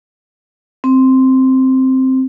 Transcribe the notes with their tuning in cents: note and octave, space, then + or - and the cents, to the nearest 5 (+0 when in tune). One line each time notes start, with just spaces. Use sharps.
C4 +0